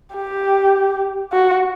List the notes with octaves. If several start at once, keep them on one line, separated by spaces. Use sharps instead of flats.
G4
F#4